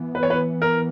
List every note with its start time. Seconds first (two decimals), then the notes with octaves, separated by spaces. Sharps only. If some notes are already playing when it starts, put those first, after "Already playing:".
Already playing: E3 B3
0.15 B4
0.23 C#5
0.30 B4
0.62 A#4